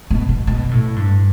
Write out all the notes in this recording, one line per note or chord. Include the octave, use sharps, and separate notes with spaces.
B2
B2
B2
A2
G2